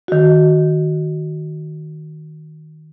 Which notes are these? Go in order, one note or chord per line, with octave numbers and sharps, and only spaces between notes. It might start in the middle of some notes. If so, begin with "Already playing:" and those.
D#3 F#4